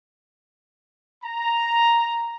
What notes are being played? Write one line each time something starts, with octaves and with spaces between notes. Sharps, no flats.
A#5